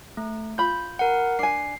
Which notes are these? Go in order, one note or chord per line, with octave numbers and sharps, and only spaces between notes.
A3
F4 B5 G6
A#4 F#5
D4 G#5 C7